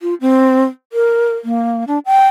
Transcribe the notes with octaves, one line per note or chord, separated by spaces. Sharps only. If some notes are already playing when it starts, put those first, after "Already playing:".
F4
C4
A#4
A#3
D4
G5